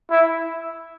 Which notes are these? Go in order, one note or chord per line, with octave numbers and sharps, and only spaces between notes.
E4